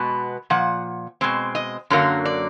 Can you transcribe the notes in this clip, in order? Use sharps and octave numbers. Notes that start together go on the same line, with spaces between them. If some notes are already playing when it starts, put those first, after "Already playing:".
Already playing: B2 G#3 B3
A#2 F3 F#5
B2 G#3 C4
D#5
F#2 D3 F#3 A#3
D5